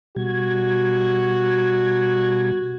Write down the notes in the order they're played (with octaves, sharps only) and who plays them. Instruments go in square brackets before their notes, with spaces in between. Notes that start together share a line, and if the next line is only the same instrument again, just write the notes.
[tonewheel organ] B2 G3 G#6 [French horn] F#4